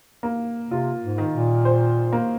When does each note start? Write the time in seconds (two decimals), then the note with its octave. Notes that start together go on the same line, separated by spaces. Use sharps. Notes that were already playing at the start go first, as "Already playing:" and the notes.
0.23 A#3
0.71 C3 F4
1.02 G#2
1.18 D#3
1.33 A#2
1.65 C5
2.12 A#3